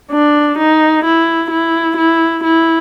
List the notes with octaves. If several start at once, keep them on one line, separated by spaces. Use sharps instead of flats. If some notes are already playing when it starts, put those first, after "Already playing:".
D4
D#4
E4
E4
E4
E4